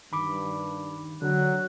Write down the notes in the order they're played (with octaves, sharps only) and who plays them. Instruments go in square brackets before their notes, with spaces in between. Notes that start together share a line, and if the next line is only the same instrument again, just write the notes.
[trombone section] G2 [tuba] D#3 [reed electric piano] B5 D6
[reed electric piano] D3 [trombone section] F#3 [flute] F#6